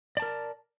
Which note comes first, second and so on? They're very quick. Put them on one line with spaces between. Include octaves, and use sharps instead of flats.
D5 A5 A#4